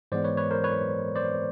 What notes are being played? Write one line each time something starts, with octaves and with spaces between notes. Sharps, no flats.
G#2 E3 G#3 B3 C5 D5
B4 C#5
B4 C#5
A#4 C5
B4 C#5
C5 D5